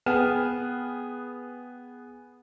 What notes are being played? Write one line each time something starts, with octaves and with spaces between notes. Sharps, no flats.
B3 G#4 B4 G5 F6 E7